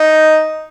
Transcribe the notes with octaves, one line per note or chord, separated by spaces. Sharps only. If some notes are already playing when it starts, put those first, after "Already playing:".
Already playing: D#4